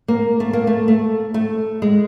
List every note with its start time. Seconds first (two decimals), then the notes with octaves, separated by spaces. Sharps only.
0.08 A#3
0.40 A3
0.53 A#3
0.67 A3
0.88 A3
1.34 A3
1.82 G#3